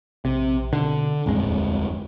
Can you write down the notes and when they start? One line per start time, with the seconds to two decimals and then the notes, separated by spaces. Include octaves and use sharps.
0.25 A#1 C3
0.73 B2 D3
1.26 G1 F2 A2 G#3
1.45 D#2